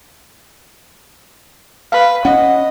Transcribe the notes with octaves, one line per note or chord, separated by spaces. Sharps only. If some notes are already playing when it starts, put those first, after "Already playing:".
B4 F5
C#4 D#5 F#5